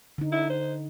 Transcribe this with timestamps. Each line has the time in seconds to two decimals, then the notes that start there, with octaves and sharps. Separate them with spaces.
0.18 D3 D#4
0.32 E4
0.50 C5